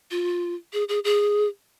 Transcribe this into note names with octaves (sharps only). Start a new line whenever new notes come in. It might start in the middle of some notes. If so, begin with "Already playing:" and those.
F4
G#4
G#4
G#4